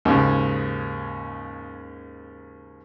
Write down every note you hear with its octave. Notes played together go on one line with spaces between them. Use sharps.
D#2 G#2 C#3